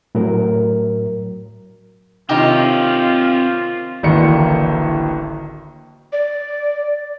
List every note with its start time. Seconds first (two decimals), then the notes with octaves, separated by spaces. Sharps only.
0.15 A2 F#3 A#4
2.29 C3 D#3 C4 D#4 F4 G4 C#5
4.03 D1 A1 D3 D#3 A#3 C#7
6.13 D5